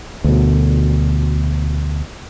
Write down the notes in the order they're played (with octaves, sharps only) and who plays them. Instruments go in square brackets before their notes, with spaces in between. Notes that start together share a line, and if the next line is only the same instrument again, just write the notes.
[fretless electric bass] D2 B2